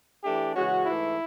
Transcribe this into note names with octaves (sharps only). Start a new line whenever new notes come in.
E3 A3 D4 G4
C#3 E3 G#3 C#4 F#4
G#2 E3 A3 E4